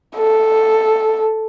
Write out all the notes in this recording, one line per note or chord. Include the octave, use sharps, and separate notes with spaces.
A4